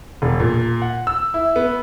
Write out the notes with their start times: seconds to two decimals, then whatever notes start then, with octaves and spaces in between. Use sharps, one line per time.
0.22 E1
0.40 A#2
0.82 F#5
1.07 E6
1.34 E4
1.56 B3